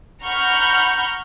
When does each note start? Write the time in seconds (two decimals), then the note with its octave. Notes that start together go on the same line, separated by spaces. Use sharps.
0.24 F#5 A#5 B5 C#6 F6 G6